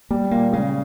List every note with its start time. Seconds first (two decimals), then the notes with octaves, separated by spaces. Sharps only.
0.10 G3 A#3
0.31 A#2 A#3
0.52 C#3 G#3